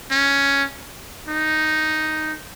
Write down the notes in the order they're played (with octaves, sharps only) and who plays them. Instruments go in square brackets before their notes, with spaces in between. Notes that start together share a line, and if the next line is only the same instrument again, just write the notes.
[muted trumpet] C#4
D#4